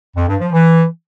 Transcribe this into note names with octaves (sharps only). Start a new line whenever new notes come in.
F2
G2
F3
E3